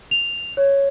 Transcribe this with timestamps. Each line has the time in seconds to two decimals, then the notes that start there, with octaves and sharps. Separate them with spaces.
0.11 F7
0.57 C#5